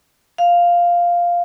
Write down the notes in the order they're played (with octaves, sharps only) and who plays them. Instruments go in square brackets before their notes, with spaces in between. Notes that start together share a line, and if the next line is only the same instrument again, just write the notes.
[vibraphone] F5